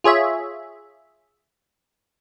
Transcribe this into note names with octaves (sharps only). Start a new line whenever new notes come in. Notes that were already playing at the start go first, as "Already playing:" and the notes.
F4 G#4 C#5 E5